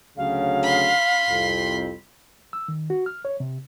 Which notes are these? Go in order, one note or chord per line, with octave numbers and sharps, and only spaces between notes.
D2 C#3 F#3 F5
B5 C6
C2 F2
E6
D#3
F#4
F6
C#5
C3